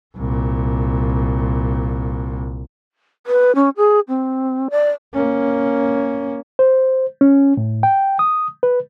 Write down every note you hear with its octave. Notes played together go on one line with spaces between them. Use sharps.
C2 A#2
B4
C#4
G#4
C4
D5
A#3 C#4
C5
C#4
A2
G5
D#6
B4